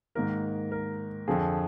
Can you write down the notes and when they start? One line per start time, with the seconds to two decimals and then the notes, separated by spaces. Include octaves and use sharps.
0.15 G#2 D#3 A#3 A#4
0.72 A#4
1.28 F2 D3 F3 G#4